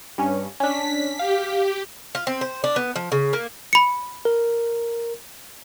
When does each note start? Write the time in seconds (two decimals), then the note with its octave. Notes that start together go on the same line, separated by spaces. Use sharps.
0.18 G2 C#4
0.60 C#4 D4 B6
1.19 G4 F5
2.15 F4
2.27 C4
2.41 C5
2.64 D4
2.76 B3
2.96 F3
3.12 C#3
3.33 A#3
3.73 B5 C#7
4.25 A#4